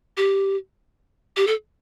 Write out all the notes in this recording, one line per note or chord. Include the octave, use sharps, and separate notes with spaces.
G4
G4
A4